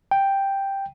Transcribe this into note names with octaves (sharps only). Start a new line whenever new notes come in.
G5